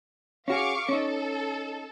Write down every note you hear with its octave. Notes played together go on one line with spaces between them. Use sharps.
C#4 F#4 G#4 F5 C#6 D6
C#4 D#4 A4